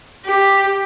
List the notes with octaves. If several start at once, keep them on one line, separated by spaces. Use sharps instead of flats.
G4